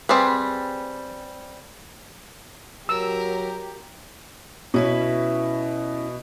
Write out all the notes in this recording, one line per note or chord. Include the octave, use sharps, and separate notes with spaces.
G3 C4 G#4 B4
F#3 G4 A#4 E6
B2 C#4 E4 B4